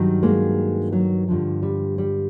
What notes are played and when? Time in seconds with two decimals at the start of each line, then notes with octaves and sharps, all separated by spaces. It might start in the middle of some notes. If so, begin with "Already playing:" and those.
Already playing: G2 D#3 F#3
0.23 G#3 A#3
0.92 F#3
1.28 G2 D3 F3
1.62 G3
1.98 G3